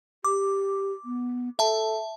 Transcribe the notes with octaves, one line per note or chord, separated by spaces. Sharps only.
G4 D6
B3
A4 E5 A5